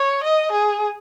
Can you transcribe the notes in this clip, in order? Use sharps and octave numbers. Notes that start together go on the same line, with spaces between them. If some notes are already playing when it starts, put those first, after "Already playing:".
Already playing: C#5
D#5
G#4